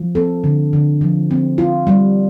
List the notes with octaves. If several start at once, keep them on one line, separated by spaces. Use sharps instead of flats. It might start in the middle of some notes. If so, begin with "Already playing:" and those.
Already playing: F3
C4 A4
D3
D3
F3
C4
F4
G3